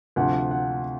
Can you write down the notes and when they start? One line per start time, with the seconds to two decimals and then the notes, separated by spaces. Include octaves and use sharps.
0.16 D2 C3 F3 F#5
0.51 F#5